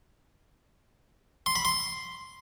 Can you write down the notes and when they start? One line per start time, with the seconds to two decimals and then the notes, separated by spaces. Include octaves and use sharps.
1.46 C6
1.56 B5
1.65 C6